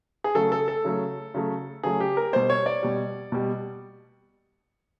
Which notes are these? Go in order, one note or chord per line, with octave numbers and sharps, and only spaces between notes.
G#4
C#3 F#3 A3 A4
A4
A4
C#3 F#3 A3
C#3 F#3 A3
C#3 F#3 A3 G#4
G4
A#4
B2 G3 C5
C#5
D5
B2 G3
B2 G3